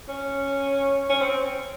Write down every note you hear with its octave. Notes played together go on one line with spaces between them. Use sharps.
C#4
C#4
C4